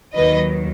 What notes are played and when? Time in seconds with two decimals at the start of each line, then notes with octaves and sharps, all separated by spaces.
0.14 D#2 D#3 F#3 B4 D#5